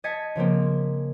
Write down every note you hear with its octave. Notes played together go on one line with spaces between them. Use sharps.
D#5 A5 G#6 A6 B6 C#7
C#3 F3 A#3 C4